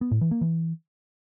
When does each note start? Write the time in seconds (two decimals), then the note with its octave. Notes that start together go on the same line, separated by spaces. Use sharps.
0.01 B3
0.11 A2
0.21 E3
0.31 A#3
0.41 E3